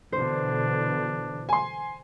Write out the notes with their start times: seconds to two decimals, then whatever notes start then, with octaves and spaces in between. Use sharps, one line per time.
0.12 B2 D3 E3 D4 C5
1.49 G#5 C6